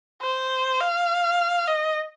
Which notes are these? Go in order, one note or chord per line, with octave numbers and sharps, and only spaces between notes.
C5
F5
D#5